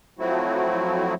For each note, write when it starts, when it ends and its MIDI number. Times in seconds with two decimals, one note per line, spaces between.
0.19 1.14 53
0.19 1.14 54
0.19 1.14 57
0.19 1.14 60
0.19 1.14 64
0.19 1.14 66